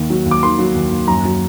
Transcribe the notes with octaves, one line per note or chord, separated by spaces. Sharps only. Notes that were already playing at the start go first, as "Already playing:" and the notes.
Already playing: D#2 D#3
F#3
D#2
D6
D#3 C6
F#3
D#2
D#2
F#2 A#5
F#3